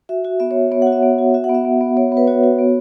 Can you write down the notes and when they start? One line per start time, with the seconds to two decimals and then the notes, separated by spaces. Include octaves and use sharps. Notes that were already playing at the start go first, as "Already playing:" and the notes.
0.09 F#4 E5
0.25 F#4
0.40 B3 E5
0.51 C#5
0.57 B3
0.72 B3 C#5
0.82 F#5
0.87 F#4
0.92 E5
1.02 B3
1.19 F#4
1.34 F#4 E5
1.44 F#5
1.49 B3
1.55 E5
1.65 B3
1.81 B3
1.97 B3 C#5
2.12 B3
2.17 B4
2.27 F#4 C#5
2.43 F#4
2.59 B3